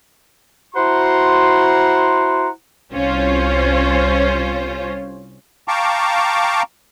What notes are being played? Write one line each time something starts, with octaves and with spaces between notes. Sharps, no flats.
E4 F#4 C5 F#5 A#5 C6
C2 C#4 F4 C5
F5 G5 A5 A#5 C#6 D6